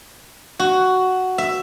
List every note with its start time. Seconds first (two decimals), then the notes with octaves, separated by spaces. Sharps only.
0.59 F#4
1.38 E5